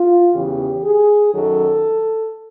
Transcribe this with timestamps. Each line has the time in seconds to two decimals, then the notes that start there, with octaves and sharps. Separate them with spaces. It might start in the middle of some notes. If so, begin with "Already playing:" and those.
Already playing: F4
0.33 E2 C#3 E3 G4
0.83 G#4
1.33 F#2 D#3 F#3 A4